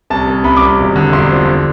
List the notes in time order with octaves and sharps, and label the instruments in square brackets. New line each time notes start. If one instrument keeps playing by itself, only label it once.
[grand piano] C2 A5
C2
C2 B5
D6
C2
E1
D3
E1 C6
F3
D3